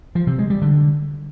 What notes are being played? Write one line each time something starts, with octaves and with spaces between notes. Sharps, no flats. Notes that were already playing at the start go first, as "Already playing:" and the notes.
F3
C3
G#3
G3
D3